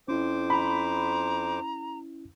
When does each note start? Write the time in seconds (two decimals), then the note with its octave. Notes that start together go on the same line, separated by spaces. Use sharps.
0.08 F2 C#4 E4 C5 D6
0.50 A#5 B5